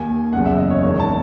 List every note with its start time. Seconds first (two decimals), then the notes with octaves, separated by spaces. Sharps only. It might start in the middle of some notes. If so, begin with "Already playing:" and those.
Already playing: D#2 D#3 G#5
0.33 F#1 E2 C#3 F#5
0.45 E5
0.58 D#5
0.70 C#5
0.83 E1 E2 D#3 C#5
1.00 A5